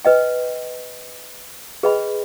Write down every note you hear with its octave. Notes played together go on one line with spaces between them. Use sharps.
B4 D#5 G5
G#4 B4 D#5 G5 B5